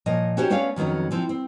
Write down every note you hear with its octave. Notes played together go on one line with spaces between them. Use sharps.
A#2 F3 C#5 D#5
C#4 D#4 F#4 G4 C5 C#5
A3 B3 C#4 C#5 D5 F5
F2 D#3 F#3 B3 C#4
E3 F3 C4
C4